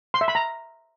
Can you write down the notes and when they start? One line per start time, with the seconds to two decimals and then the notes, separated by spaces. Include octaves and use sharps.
0.14 C6
0.21 E5
0.28 B5
0.35 A#5